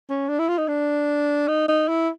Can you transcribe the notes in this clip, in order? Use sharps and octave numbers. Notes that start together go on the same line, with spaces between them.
C#4
D4
E4
F4
D#4
D4
D#4
D#4
E4